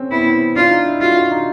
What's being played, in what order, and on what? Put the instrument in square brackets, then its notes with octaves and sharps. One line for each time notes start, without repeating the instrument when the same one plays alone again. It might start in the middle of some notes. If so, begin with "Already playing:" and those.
Already playing: [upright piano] C4 C#4
[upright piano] B3 [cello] E4
[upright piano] C4
[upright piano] D4 [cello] F4
[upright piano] D#4
E4
[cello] F4 [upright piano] F#4
[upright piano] F4
D#4